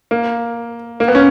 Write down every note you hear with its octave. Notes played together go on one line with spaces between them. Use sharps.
A#3
A#3
B3
C#4